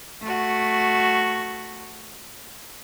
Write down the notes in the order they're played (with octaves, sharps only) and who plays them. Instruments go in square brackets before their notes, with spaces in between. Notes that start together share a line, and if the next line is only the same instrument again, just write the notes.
[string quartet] A3 F#4